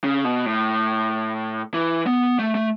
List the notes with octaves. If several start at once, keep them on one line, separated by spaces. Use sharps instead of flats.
C#3
B2
A2
E3
B3
A3
A3